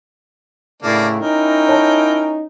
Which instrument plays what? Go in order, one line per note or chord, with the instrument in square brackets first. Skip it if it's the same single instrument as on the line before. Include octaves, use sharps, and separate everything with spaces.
[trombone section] A2 C#3 E4 [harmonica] A#3 D4
[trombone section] C#4 D#4 E4 [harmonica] A#4 G5
[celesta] C#5 A5